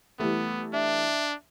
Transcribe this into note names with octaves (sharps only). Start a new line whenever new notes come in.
E3 G3 A3 B3
D4 E5